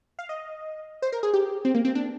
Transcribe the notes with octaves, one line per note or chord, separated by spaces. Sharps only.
F5
D#5
C5
A#4
G#4
G4
C4
A#3
C4
D4